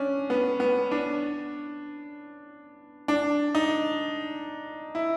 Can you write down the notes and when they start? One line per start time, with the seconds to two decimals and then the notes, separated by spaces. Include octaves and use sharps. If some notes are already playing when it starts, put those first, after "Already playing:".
Already playing: C#4 D4
0.30 B3
0.60 B3
0.91 D4
3.08 D4
3.55 D#4
4.95 E4